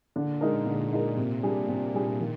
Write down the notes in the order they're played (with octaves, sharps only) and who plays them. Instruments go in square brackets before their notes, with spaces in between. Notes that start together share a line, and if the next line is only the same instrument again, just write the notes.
[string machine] A#2 [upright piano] D3
[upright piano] G#3 D#4 A#4
[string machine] A#2 [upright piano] D3
[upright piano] G#3 D#4 A#4
C3
G3 D4 G#4
C3
G3 D4 G#4
D#3